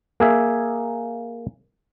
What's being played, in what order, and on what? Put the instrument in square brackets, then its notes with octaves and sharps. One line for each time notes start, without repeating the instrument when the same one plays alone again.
[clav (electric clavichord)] A#3 G#4 E5